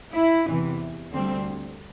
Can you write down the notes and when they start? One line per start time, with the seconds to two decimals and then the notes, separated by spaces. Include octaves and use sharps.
0.14 E4
0.46 E2 C3 E3
1.12 D2 D3 G3 C4